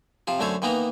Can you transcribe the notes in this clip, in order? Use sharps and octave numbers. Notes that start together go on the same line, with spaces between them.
C3 F3 F4
F#2 D3 A3 A4 C5 C#5
D#3 E3 A#3 B3 D#4 A#5